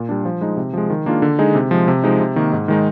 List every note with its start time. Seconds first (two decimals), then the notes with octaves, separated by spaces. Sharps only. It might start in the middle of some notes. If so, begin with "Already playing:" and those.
Already playing: A#2
0.09 G3 D4
0.25 F3
0.41 G#3 D#4
0.57 C3
0.74 F3 G#3
0.90 D#3
1.06 A#3 D4 F4 G#4
1.22 D3
1.39 G#3 D#4 G#4
1.55 C3
1.71 F3 G#3
1.88 C3
2.04 F3 G#3 D#4
2.20 C3
2.36 D#3 A#3
2.52 G#2
2.68 D#3 G#3 D#4